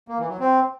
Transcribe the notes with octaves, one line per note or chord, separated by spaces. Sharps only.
A#3
E3
F#3
C4